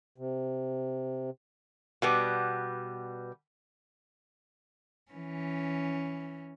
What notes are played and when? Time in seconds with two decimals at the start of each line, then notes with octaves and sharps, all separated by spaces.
0.18 C3
2.02 B2 G3 B3
5.12 E3 C#4